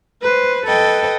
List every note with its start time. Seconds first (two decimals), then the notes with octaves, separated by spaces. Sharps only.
0.21 B4 C5
0.64 A4 B4 D#5 G5